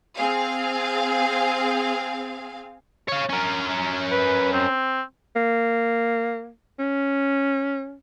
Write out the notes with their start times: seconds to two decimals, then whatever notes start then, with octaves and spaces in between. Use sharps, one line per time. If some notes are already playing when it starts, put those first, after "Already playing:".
0.16 C4 G#4 F5
3.08 C#5 F5
3.29 C#4 A#4
4.12 B4
4.53 C4
5.36 A#3
6.79 C#4